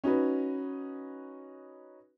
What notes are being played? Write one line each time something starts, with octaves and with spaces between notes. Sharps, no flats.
C#4 D#4 F#4 B4